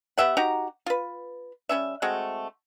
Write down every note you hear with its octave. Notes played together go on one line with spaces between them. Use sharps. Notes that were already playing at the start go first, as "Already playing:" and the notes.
B3 G4 E5 F#5
D#4 F#4 G4 A#5
F4 B4
G3 B3 C#4 E5
G#3 A3 C4 F#4